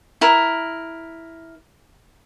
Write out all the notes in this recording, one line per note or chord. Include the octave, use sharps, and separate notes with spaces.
E4 A#4